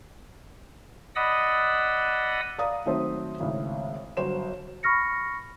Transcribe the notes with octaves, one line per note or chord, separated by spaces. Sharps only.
D5 D#5 F#5 B5 D#6 E6
D5 F5 A#5 D#6
D#3 F#3 A3 C4 C5
G#1 A2 C#3
G1 F#3 C5 E7
B5 C#6 F6 A#6 C#7